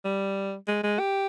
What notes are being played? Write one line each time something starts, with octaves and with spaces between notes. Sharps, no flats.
G3
G#3
G#3
G4